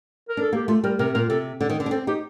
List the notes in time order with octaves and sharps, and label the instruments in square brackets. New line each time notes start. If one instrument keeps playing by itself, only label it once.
[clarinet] A#4
[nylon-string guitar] D4 [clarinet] A4
[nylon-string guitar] A#3 [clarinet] G4
[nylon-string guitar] A3 [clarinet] F4
[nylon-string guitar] G3 [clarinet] A#4
[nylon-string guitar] C3 [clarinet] A#4
[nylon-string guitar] A#2 [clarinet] A#4
[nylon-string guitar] C3 [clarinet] A4
[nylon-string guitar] D3 [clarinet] A4
[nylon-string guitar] D#3
D3
D4
[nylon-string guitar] C4 [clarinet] A4
[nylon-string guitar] D#4 [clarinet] G4